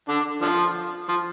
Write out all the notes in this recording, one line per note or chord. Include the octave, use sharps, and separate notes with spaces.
D3 D4
D3 F3
F3